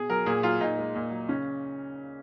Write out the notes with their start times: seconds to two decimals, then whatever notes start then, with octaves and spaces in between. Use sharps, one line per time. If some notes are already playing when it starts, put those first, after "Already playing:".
Already playing: B2 G#4
0.10 F#3 A#4
0.26 A#2 G#4
0.43 F#3 F4
0.61 A#2 D#4
0.78 G#3
0.95 A#2
1.11 F#3
1.29 C#3 C#4